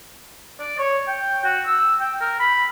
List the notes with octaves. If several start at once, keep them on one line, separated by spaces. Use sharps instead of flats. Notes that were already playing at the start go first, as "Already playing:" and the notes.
D5
C#5
G5
F#4
E6
G5
A#4
B5